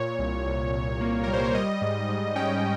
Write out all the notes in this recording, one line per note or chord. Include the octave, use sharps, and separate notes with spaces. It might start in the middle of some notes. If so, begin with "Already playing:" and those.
Already playing: A#2 C#5
C2
C2
C2
A#3
G3 A#4
C5
C#5
G3 D#5
G#2
G#2
C#4 G5